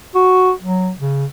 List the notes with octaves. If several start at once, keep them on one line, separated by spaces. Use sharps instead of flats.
F#4
F#3
C#3